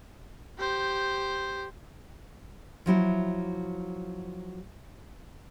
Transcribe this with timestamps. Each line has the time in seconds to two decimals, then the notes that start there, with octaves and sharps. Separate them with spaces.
0.59 G4 C5
2.86 F3 F#3 E4 F#4